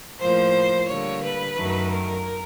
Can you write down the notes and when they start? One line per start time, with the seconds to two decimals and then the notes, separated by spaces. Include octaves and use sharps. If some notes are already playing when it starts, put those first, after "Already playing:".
0.19 A2 F3 A#3 C5
0.87 D3 G3 A#3 C#5
1.21 B4
1.56 F#2 D#3 F#3 A3
1.90 A#4